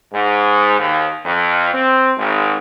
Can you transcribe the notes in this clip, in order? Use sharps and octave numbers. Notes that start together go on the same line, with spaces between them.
G#2
D#2
F2
C4
G#1